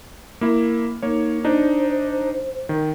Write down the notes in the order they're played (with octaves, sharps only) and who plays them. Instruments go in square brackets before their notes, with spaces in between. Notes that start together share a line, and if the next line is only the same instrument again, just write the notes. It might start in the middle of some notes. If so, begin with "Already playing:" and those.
[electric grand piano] A#3 E4
[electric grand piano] A#3 C#5 [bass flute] D#4
[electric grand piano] D4 D#4 [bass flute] C5
[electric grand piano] D#3